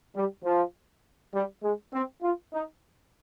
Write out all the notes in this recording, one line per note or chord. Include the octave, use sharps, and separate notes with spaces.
G3
F3
G3
G#3
C4
F4
D#4